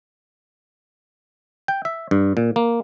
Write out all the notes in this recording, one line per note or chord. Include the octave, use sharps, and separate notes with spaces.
G5
E5
G2
A#2
A#3